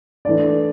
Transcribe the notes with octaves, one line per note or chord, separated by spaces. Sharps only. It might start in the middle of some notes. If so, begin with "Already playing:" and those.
E3 A3 D4 D5